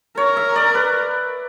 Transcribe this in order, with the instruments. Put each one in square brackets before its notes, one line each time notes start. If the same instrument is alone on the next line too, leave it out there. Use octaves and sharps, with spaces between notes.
[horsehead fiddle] A#4 [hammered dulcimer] C#5
[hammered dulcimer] E5
D5
B4